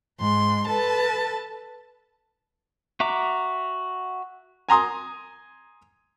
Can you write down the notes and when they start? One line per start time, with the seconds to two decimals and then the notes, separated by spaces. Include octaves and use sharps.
0.21 G#2 C6
0.67 A4 B4 A5
3.00 F#4 E5 A#5 D6
4.69 G#5 A#5 C6 D#6